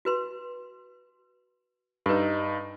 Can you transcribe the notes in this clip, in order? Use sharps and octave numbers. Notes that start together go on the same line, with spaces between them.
F#4 B4 C6
G2 D#4 A4 B4